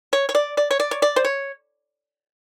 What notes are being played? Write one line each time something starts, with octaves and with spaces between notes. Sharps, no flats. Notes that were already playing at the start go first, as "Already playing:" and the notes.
C#5
C#5
D5
D5
C#5
D5
C#5
D5
C5
C#5